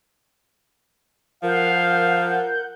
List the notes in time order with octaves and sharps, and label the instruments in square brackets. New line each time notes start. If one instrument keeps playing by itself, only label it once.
[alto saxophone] F3 [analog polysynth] A#4 F#5 G6 [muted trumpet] F5